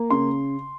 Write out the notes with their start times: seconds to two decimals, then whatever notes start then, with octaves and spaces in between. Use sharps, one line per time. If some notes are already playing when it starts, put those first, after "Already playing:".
Already playing: A#3
0.10 C#3 C6